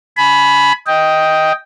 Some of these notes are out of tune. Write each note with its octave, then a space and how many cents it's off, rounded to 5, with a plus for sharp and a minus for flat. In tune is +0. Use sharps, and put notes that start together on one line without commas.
G#5 +30 B5 +0
D#5 +10 G5 +0